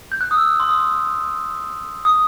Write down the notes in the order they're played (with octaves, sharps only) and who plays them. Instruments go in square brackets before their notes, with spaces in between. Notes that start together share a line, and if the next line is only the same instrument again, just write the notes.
[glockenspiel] G6
F#6
D#6
E6
C6
D#6
D#6